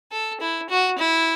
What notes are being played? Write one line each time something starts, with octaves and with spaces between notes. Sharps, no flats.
A4
E4
F#4
E4